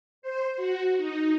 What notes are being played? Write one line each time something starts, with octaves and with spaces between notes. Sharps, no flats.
C5
F#4
D#4